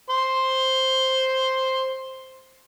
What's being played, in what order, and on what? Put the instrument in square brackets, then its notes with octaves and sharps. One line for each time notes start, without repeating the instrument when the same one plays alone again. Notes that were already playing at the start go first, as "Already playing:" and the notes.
[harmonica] C5 C6